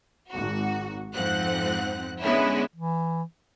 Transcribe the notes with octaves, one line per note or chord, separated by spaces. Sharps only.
G#1 F#4
F2 G#2 F3 C4 F#5 F#6
D3 G#3 B3 C#4 E4
E3